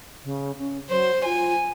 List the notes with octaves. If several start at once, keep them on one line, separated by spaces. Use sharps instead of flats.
C#3
C#4
F#3 C5
F4 G#5